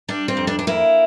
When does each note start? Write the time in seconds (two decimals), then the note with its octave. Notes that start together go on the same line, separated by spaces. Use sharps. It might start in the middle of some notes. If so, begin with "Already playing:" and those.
0.08 G3 D4
0.28 C4
0.37 F2
0.47 D4
0.59 D4
0.67 A#3 E4